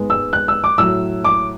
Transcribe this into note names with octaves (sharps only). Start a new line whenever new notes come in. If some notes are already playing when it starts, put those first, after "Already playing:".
Already playing: G#2 G#3 B3
E6
F#6
E6
D6
A2 F#3 A3 E6
D6